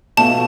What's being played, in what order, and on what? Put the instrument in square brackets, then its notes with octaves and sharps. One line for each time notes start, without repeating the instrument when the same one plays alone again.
[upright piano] B1 B2 A3 C#4 F4 [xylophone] A5